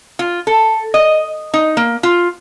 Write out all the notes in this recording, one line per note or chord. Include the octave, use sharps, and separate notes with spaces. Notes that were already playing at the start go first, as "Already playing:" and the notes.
F4
A4
D#5
D#4
A#3
F4